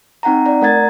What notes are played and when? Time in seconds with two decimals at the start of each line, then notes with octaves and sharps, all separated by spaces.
0.23 C4 D#4 F#5 G5 A#5
0.46 D5 A#5
0.61 A3 A#4 F#5 A#5 G#6 A6